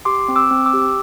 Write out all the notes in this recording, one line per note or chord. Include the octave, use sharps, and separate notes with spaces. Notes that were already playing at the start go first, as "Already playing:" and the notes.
G4 C6 D6
C4
D6 E6
C4
D6 E6
G4